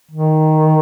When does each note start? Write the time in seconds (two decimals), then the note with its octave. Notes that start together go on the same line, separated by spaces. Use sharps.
0.11 D#3